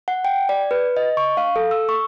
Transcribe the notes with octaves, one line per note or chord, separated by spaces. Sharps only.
F#5
G5
D5
B4
D#5
C#6
F5
A4
E6
C#6